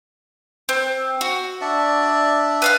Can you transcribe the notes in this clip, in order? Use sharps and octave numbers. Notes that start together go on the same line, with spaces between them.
C4
F#4
D4 D5 E5
B4 F5 F6